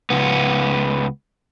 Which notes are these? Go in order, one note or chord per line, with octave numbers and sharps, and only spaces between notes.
C#2 B3